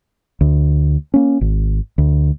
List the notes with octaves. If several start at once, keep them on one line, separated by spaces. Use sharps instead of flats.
D2
A#3 C#4
G#1
D2